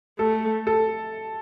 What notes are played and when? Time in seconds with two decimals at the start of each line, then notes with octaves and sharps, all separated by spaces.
0.19 A3 A4
0.67 A4